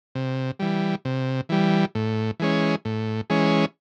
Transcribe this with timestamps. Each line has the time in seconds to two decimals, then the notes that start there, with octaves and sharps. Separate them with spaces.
0.15 C3
0.59 E3 G3
1.05 C3
1.49 E3 G3
1.95 A2
2.40 E3 G#3 C#4
2.85 A2
3.30 E3 G#3 C#4